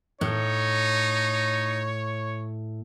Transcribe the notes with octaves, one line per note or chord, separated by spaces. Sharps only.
A2 D#4 C#5